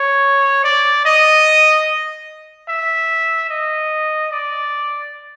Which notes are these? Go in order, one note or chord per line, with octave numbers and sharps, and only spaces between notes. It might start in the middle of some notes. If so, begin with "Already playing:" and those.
Already playing: C#5
D5
D#5
E5
D#5
D5